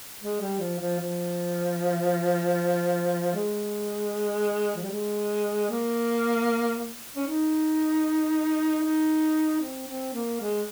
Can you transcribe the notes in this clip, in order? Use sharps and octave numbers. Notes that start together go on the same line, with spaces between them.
G#3
G3
F3
F3
F3
G#3
F3
G3
G#3
A#3
C#4
D#4
D#4
C4
C4
A#3
G#3